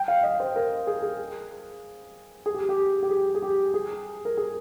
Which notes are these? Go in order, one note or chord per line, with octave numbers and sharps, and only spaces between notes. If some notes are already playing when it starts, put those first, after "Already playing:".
Already playing: G5
F5
D#5
C5
A#4
G#4
G#4
G#4
G4
G4
G4
G#4
G#4
G4
G#4
A#4
G#4